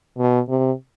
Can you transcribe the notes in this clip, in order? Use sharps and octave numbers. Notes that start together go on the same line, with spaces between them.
B2
C3